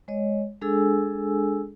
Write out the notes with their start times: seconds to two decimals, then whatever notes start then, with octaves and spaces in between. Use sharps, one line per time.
0.08 G#3 C#5 D#5
0.61 G#3 D4 G#4 A4 G#5 E6